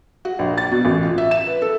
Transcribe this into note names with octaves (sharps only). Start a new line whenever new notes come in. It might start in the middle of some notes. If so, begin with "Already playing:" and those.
F#4
A#1
A6
B2
A1
F4
E5
E7
B4
A4